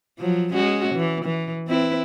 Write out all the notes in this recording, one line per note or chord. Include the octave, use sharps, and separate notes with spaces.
F3 F#3
G#3 C#4 F#4
E3
E3
C4 E4 B4